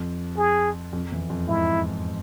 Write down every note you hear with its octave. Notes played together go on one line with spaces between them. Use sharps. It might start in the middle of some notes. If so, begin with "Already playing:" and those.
Already playing: F2
G#4
F2
E2
F2
G#2 E4